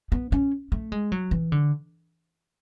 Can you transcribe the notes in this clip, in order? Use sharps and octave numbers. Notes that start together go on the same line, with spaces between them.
B3
C#4
A3
G#3
F#3
E3
D3